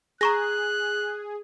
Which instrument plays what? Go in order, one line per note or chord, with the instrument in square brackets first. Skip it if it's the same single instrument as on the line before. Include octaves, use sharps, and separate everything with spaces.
[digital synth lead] G#4 [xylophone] A#5 C#6 A#6 [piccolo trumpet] F#6